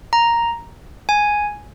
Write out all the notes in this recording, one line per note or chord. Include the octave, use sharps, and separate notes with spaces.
A#5
G#5